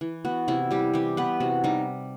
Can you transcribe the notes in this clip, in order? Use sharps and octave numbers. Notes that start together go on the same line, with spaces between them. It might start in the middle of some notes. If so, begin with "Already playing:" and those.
E3
B3 F#4
C3 E4
G3 G4
E3 G4
B3 B4
C3 F#4
G3 D#4